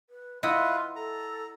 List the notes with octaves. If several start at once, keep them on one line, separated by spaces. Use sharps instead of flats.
B4
E4 F4 B4 D#5 F#5 C6 G6
A4 A#5